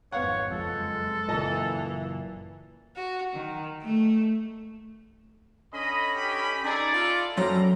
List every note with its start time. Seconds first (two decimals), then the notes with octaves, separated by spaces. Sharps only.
0.12 G#1 F2 B3 C#5 F5 F#5
0.51 F#1 F2 G#3 A4
1.29 F#1 A#2 E3 D#5 A5
2.96 F#4
3.34 D#3
3.82 A3
5.74 D3 C#4 D#5 B5
6.14 G4 D#5
6.64 C#4 D#4 E4 G#4 A4 D5
6.94 F4
7.37 F#2 G3 C4 A4 A#5